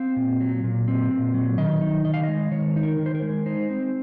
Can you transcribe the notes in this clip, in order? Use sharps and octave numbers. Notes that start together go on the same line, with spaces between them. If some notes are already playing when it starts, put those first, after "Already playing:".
Already playing: C4 F5
A#2
F#3
A#2
C4
A#2
F#3
D#3 D#5
D#4
D#3 D#5
F5
G#3 D#5
D#3 C#5
D#4
A#4
D#3
C5
A#4
G#3
D#4 C5
C4